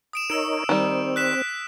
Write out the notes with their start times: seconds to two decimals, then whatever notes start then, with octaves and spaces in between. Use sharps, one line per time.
0.13 D#6 D7 E7
0.30 D#4 A#4 C#5 E6 D7
0.69 D#3 G3 C4
1.16 F#6 B6 E7